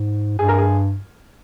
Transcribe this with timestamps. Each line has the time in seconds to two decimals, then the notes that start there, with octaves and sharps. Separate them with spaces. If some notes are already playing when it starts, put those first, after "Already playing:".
Already playing: G#2
0.39 G2 G#4
0.49 A#4
0.58 G#4